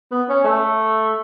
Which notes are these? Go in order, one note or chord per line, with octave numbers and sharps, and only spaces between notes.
B3
C#4
A3